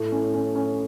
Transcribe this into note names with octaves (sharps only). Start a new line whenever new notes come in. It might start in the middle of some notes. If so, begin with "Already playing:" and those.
Already playing: A2 A3
C#4
C#4
C#4